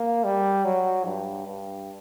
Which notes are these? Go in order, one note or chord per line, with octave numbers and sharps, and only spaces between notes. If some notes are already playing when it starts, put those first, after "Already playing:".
Already playing: A#3
G3
F#3
G2
G2